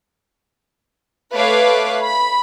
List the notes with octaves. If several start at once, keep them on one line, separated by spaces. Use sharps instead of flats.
A3 B4 C#5 F5 D6 F#6
B5